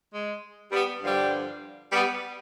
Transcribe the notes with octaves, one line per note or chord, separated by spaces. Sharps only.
G#3
G3 B3
G2 D3 F3 G3
G3 B3